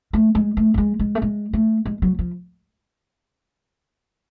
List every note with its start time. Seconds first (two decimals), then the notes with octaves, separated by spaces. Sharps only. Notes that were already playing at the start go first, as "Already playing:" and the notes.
0.13 A3
0.35 G#3
0.57 A3
0.74 A3
0.78 G#3
0.99 G#3
1.15 A3
1.22 G#3
1.53 A3
1.86 G#3
2.02 F#3
2.19 F3